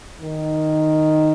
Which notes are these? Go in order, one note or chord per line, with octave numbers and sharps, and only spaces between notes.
D#3